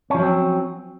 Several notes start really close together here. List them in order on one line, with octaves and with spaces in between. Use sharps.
C#4 F3 F#3 C4